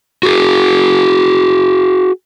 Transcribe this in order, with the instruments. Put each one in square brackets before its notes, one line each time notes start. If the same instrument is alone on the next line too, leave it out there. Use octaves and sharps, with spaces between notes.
[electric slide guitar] F#4 G#4